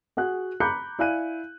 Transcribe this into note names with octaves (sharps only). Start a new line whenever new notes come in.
F#4 G#4 F#5 F#6
A#5 B5 D6 F#6 G6 C#7
E4 D5 F5 G#5 F#6 D#7